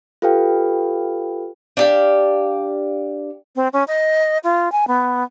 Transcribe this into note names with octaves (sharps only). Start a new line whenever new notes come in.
F4 G4 A4 B4 F5 G5
D4 G4 F5
C4
C#4
D#5
F4
G#5
B3